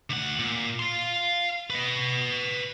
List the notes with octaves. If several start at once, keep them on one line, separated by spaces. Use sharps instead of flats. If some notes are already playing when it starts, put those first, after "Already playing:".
D2 F#5
A#2
F5 C6
B4 D#5